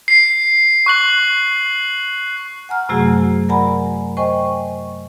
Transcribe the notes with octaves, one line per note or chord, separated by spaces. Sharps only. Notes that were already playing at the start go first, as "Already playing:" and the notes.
C7
C#6 F#6 F#7
F#5 G#5 A#5 F6
F#2 C3 F#3 A3 F#4 G#4
A#4 D5 F#5 G#5 A#5 B5
C5 D#5 G5 G#5 C#6